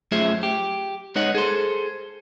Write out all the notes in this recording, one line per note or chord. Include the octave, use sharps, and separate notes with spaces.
F#2 A3 F4 G#4 C5 E5
G4
G#3 D#4 B4 C#5 D#5 F#5
G#4 A4 C5